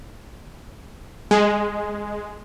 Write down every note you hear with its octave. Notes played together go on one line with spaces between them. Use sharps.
G#3